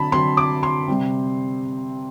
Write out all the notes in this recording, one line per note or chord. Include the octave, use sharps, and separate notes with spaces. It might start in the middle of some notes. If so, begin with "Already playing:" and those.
Already playing: D3 F#3 C4 A5 B5
D3 F#3 C4 C6
D6
C6
C3 G3 C4